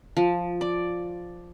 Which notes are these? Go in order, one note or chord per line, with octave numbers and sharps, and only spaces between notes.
F3
D5